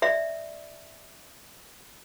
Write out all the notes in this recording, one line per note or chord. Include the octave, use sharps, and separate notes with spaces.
D5 E5